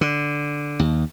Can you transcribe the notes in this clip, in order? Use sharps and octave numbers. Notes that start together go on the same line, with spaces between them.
D3
D#2